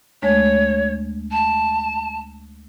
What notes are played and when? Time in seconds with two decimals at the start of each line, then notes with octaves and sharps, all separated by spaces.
0.22 D2 G#3 A3 C#5
1.31 A5